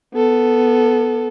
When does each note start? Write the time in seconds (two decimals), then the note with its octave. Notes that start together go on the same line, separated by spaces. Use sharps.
0.14 B3 A4